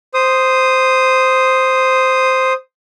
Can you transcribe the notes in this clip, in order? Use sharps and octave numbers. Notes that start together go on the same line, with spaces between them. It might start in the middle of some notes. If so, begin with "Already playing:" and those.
C5 D#6